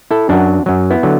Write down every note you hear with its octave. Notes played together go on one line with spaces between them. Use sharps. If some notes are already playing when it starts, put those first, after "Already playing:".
E4 A4
F#2 F#3 D4 F#4
F#2 F#3
B3 E4
D3 F#3